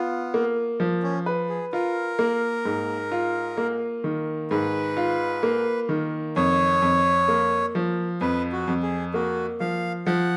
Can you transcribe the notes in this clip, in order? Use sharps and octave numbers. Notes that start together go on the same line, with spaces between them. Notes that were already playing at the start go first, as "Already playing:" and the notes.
Already playing: B3 F4
A#3
F3
C#4
B4
G#4
F4 A#4
A#3
G#2
F4
A#3
D#3
G#2 B4
F4
A#3
D#3
F2 C#5
F2
A#3
F3
F2 B4
F#4
F2
G#4
A#3 F#4
F3 F5
F3 F#5